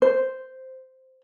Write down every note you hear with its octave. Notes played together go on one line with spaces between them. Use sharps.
C5